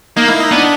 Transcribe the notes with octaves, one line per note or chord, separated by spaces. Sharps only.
A#3 D#4
E4
D#4
B3 D4